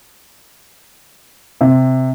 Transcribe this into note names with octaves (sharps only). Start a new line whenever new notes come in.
C3